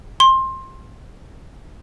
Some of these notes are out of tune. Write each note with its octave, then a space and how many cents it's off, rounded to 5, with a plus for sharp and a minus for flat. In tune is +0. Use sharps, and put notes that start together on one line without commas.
C6 +20